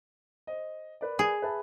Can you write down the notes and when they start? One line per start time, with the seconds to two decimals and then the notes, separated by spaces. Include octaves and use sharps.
0.47 C5 D#5
1.01 A#4 B4 D5
1.19 G#4
1.42 B4 E5 A5